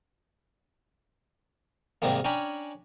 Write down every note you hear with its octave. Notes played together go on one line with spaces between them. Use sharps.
G#2 C3 D#3 G3 G#3 A#3
C#4 D4 G5 G#5 A#5 B5